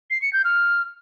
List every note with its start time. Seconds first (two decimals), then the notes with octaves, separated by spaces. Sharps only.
0.10 C7
0.22 C#7
0.33 G6
0.44 F6